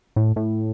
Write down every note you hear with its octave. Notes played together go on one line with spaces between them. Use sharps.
A2
A2